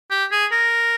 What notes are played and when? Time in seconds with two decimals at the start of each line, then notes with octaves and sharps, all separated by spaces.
0.10 G4
0.31 G#4
0.51 A#4